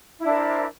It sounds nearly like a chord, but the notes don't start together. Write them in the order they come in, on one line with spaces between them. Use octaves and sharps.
E4 D4 A#4 C5